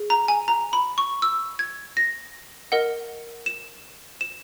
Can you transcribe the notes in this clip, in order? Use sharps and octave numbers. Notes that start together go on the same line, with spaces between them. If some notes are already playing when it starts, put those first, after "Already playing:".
Already playing: G#4
A#5
G#5
A#5
B5
C#6
E6
G#6
A#6
A#4 D#5 F#5
E7
E7